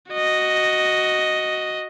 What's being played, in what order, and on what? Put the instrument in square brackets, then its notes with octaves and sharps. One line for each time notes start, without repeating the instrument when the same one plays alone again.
[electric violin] F#4 D#5